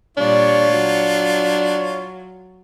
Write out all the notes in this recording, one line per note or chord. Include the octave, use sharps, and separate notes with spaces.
A#2 G3 D4 F4 C#5
F#3